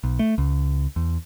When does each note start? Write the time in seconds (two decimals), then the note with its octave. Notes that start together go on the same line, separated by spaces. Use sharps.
0.04 B1
0.19 A3
0.38 C#2
0.96 E2